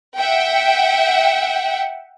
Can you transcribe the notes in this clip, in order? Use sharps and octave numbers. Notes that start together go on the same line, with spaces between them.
E5 F#5 G5